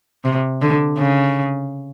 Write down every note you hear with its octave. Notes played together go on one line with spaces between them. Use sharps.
C3
D3
C#3